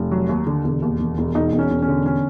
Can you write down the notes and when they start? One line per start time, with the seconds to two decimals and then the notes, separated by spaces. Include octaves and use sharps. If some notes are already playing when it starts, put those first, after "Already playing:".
Already playing: F1
0.11 F#3
0.29 D#2
0.47 D3
0.64 E1
0.82 D#2
0.99 E1
1.18 E1
1.35 E1 D#4
1.53 E1
1.58 C#4
1.71 E1
1.82 C#4
1.88 D3
2.06 C#4